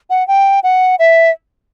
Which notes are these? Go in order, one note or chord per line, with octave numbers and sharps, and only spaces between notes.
F#5
G5
F#5
E5